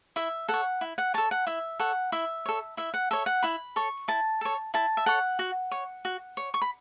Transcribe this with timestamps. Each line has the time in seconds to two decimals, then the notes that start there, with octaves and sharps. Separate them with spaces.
0.16 E4 E5
0.48 A4 C#5 F#5
0.81 E4
0.98 F#5
1.14 A4 C#5 A5
1.31 F#5
1.47 E4 E5
1.79 A4 C#5 F#5
2.12 E4 E5
2.46 A4 C#5
2.77 E4 E5
2.94 F#5
3.11 A4 C#5 E5
3.26 F#5
3.43 E4 B5
3.76 A4 C#5 C#6
4.08 E4 A5
4.41 A4 C#5
4.74 E4 A5
4.97 E5
5.06 A4 C#5 F#5
5.39 F#4
5.71 C#5
6.05 F#4
6.37 C#5
6.54 C#6
6.62 B5